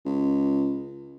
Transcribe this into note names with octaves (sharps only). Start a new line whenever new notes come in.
C#2